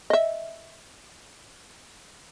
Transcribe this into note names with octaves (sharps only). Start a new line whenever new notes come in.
D#5 E5